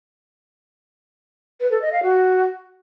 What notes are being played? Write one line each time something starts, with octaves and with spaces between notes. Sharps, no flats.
B4
A4
D#5
F5
F#4